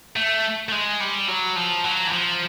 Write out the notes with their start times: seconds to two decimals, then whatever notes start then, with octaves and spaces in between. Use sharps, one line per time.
0.16 A3
0.69 A3
0.72 G#3
1.01 G3
1.28 F#3
1.56 F3
1.84 F#3
2.07 E3
2.12 F3